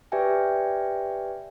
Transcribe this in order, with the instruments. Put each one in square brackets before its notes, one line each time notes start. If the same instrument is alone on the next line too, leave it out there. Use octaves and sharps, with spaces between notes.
[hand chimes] G4 B4 D5 E5 G5 G#5